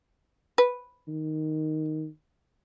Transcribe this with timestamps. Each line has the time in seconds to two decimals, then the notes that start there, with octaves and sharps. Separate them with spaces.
0.58 B4
1.08 D#3